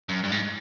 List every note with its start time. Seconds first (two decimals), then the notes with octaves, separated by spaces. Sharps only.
0.09 F#2
0.24 G2
0.32 G#2